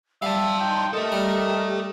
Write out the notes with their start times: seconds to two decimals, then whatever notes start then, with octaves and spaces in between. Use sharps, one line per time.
0.22 G3 E5 F5 G5 A5
0.60 D#4 G5 C6
0.93 G4 A4 A#4 D#5 E5
1.12 G3